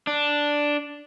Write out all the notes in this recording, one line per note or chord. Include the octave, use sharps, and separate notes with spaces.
D4